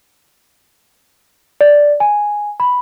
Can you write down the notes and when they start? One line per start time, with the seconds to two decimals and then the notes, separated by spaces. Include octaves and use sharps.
1.61 D5
2.00 G#5
2.60 B5